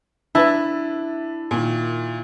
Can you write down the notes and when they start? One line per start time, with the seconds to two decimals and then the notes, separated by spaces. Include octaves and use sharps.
0.35 D4 E4 B4 E5
1.51 A#2 D#3